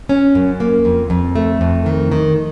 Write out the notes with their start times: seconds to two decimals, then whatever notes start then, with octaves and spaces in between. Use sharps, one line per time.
0.09 C#4
0.35 F#2
0.60 A#3
0.85 F2
1.10 F2
1.36 A3
1.61 F2
1.86 D#3
2.12 D#3